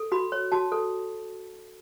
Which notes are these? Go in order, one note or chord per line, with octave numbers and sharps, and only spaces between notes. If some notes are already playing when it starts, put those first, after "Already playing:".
Already playing: A4
F#4 B5
C#5
F#4 A5
A4